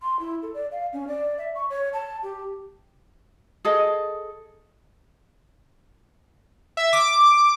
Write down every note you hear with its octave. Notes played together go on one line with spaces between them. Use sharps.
C6
E4
A4
D5
F5
C#4
D5
E5
C#6
C#5
A5
G4
G#4 A4 D#5
E5
D6